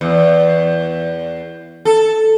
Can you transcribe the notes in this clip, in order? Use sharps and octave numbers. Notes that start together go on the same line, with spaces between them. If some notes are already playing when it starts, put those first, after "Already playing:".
E2
A4